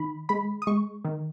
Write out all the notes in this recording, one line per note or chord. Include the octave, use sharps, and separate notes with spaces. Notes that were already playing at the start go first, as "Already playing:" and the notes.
Already playing: D#3 B5
G#3 B5
D#6
G#3 C#6
D#3